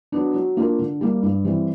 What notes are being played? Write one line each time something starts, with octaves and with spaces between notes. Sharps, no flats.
F#3 B3 D4
F#3
A#3 D4 F4 A#4
D3
G3 A#3
G2
E3 G3 C4